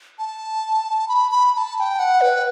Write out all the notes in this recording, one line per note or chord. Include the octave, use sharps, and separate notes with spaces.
A5
B5
B5
B5
A5
A5
G5
F#5
B4